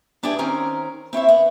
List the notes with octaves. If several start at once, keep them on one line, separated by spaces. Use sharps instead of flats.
B3 D4 E4 G4 G#4
D#3 C4 C#4 A#4
C4 E4 C#5 E5
B3